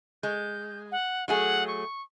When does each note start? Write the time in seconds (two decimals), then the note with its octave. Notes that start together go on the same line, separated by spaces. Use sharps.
0.23 G#3 G6
0.92 F#5
1.28 F#3 A3 G#4 F#5
1.68 C#6